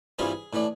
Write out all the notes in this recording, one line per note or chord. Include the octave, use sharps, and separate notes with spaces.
G2 E3 G3 C4 F4 G#4
A2 E3 A3 D4